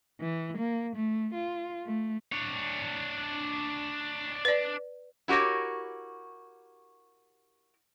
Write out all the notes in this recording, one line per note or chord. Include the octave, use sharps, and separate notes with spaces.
E3
A#3
A3
F4
A3
D4 C#5
B4 D5
E4 F#4 G4 A#4 C#5